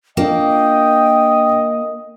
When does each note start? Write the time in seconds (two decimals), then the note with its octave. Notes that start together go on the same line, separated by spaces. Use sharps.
0.17 A#3 D4 F4 D#5 G5